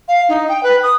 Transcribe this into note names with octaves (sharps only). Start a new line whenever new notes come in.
F5
D#4
G5
B4
D#6